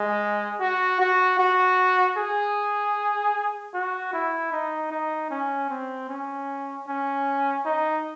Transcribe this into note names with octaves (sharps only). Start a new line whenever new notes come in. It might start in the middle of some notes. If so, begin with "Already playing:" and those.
Already playing: G#3
F#4
F#4
F#4
G#4
F#4
E4
D#4
D#4
C#4
C4
C#4
C#4
D#4